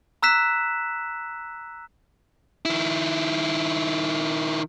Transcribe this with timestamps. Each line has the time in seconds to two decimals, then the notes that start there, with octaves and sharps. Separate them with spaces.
0.23 A#5 E6 F#6 B6 E7
2.65 D#3 E4